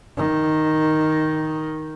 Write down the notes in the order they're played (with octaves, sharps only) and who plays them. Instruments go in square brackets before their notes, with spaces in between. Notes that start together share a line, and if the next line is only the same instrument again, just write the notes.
[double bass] D#3